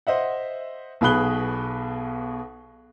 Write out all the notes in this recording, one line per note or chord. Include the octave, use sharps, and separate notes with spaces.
C5 D#5 E5 F#5
B1 B2 G#4 B5 F#6 G7